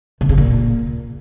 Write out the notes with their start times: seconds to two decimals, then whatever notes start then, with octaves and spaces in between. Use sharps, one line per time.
0.21 C3
0.29 C#3
0.38 A#2